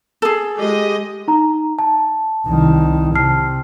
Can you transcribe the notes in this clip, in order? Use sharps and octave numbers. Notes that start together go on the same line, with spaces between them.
G#4 A4
G#3 G4 D#5
D#4 A#5
A5
C2 D#3
C3 A5 F6 C7